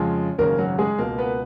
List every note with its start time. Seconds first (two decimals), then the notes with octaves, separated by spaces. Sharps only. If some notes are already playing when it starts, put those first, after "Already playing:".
Already playing: F2 C#3 F3 G#3 C#4
0.38 G#1 F#2 C#3 A#3 A#4
0.58 F#3 F#4
0.79 G#3 G#4
0.98 C#2 B2 A#3 A#4
1.18 B3 B4